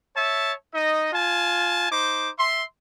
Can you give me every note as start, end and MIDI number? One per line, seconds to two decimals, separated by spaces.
0.16 0.52 73
0.16 0.52 76
0.16 0.52 81
0.74 1.09 63
0.74 1.09 75
1.12 1.87 65
1.12 1.87 80
1.12 1.87 81
1.91 2.29 63
1.91 2.29 72
1.91 2.29 86
2.37 2.63 76
2.37 2.63 84